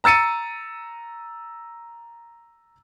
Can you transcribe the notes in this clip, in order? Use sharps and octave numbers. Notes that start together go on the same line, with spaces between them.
A#5 E6 A6 C#7 D#7